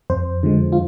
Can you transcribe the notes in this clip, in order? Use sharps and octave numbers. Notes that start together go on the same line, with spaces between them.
F2 C5
D3 F3 G#3
F4